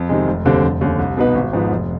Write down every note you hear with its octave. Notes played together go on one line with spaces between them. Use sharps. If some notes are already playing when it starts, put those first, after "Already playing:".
Already playing: F2
C3 D#3 G#3
F1
D#2 D3 G3 C4
F1
D#2 D3
C2
B2 B3 D#4 B4
G#1
G#2 F3 B3
F1